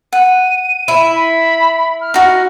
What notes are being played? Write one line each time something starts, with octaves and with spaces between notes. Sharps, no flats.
F#5 D#7
E4
B5
F6
D#4 F#4